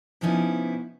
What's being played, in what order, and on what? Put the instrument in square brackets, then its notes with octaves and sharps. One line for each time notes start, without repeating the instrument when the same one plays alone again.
[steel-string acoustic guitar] C3 F3 B3 C#4 D#4 E4